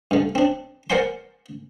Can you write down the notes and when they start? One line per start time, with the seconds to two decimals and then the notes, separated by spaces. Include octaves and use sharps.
0.11 G2 D3
0.35 C4 D4
0.90 A#4 C5 D5 F#5 G#5 C6